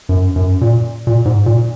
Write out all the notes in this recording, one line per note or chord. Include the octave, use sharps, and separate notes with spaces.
F#2
F#2
A#2
A#2
G#2
A#2